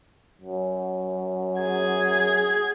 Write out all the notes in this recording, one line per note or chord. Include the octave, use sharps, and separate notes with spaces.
F#2
G#4 G#6